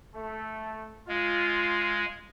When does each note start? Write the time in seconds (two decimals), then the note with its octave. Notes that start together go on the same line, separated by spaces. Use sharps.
0.15 A3
1.08 G#3 F4